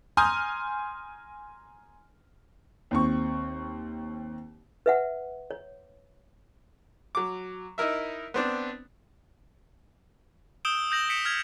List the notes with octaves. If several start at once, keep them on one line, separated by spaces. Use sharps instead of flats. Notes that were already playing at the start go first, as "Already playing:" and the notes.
G#5 A#5 C6 D#6 F6 G6
D#2 C4 C#6
B4 E5 F#5
C#5
F#3 D6
D#4 E4 A#4 E5
B3 C4 D4
D#6 E6 G6 D7 E7 G7
D#6 G6 A#6 F#7
A#6 B6 C#7 D7 E7
F6 G#6 F7